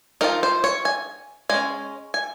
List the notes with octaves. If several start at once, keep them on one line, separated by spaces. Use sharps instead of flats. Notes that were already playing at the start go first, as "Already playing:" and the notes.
F3 G#3 D#4 A#4
C5
C#5
G#5
G#3 C#4 G#5
G#5